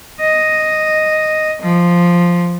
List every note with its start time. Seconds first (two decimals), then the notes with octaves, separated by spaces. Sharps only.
0.20 D#5
1.62 F3